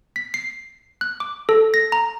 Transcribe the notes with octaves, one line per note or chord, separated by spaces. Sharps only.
B6
C7
F#6
D6
A4
A#6
A#5